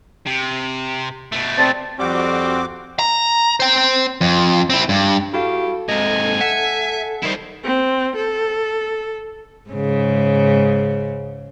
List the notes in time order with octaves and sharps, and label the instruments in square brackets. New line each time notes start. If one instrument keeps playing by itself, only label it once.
[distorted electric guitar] C3
B2 A3
[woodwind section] C4 D5 A5
[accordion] F2 F#4 D6 [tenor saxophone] G3 [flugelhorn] C4
[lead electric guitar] A#5
C5 G5
F2
C4 E4
G2
[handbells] E4 F#4 F5 [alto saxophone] G4 [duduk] A4
[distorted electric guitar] G#2 C3 [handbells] D#5 [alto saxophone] G#5
[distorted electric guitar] E5 [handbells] F#5
[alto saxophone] D#3 [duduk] G3 [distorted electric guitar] E4 C5
[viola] C4
A4
[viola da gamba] G#2 C#3